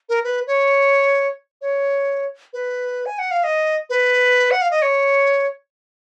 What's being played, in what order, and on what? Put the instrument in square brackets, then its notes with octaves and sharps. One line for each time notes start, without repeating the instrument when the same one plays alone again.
[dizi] A#4
B4
C#5
C#5
B4
G#5
F#5
F5
D#5
B4
F#5
F5
D#5
C#5